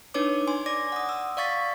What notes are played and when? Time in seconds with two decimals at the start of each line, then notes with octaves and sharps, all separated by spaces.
0.14 D4 D#4 B4 C#5 D6
0.47 G#5 C6
0.66 D5 D6 A#6
0.92 F#5 D#6
1.09 E6
1.37 D5 F5 C#6 A6 B6